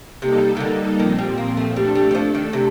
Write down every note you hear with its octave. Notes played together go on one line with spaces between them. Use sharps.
C3 G3 A#3 D#4 A4
C3
D3
A#2 D#3 F3 C4
G3
A#3
A3
G3 A3 D4 A4
G3
G3
F3
D#3
C3